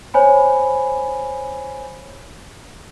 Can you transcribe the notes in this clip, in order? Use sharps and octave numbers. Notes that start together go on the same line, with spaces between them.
C5 C#5 G#5 B5